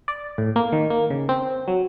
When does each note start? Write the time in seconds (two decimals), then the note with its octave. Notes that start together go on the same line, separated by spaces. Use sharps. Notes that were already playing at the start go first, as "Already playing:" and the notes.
0.08 D5
0.38 A2
0.56 A#3
0.73 D#3
0.90 A#3
1.10 C#3
1.29 C4
1.68 F#3